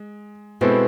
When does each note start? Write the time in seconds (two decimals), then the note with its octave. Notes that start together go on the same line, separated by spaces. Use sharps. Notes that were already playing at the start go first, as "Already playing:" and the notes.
Already playing: G#3
0.61 B2 G#3 C4 E4 A4 C5